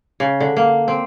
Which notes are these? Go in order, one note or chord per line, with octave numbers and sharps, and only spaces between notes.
C#3
D3
A#3
C4